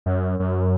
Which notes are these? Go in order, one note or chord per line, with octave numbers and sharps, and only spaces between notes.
F#2
F#2